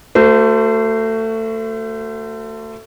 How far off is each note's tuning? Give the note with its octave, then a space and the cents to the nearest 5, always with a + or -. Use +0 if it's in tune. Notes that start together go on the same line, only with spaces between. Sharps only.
A3 +25 F#4 +0 C5 -25